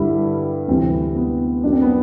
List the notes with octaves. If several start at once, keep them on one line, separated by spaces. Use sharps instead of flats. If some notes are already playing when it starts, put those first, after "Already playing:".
Already playing: G2 D3 G3 E4
D2 C3 E3 G3 C4
B3
F#2 F#3 D4
C4
B3